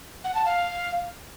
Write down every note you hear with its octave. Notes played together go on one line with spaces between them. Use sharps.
F#5
A5
F5